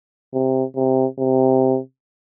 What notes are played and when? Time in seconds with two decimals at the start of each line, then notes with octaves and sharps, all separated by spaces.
0.34 C3
0.76 C3
1.19 C3